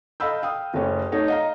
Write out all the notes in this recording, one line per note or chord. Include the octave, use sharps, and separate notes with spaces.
A4 D#5 F5 B5 E6 G6
F5 G5 D#6
F#1 A3 C#4 G4
A3 D#4 C#5
D#5 F5 A#5